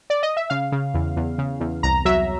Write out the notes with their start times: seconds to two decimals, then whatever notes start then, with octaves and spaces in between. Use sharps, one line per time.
0.10 D5
0.23 D#5
0.37 E5
0.50 C#3 F5
0.72 C#3
0.94 E2
1.16 E2
1.38 C#3
1.60 E2
1.83 C2 A#5
2.05 F#3 E5